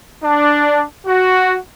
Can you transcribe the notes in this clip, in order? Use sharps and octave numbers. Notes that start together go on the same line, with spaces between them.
D4
F#4